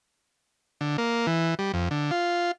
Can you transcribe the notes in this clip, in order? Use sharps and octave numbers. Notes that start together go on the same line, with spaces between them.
D3
A#3
E3
G3
F2
D3
F4